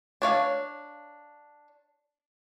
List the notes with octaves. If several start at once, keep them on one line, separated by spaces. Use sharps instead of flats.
D4 C#5 F5